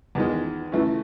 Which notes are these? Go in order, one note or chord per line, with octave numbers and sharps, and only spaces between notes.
E2 D#3 G#3
C#3 E3 A3